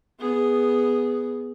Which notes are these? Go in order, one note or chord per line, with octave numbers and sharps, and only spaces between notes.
B3 G#4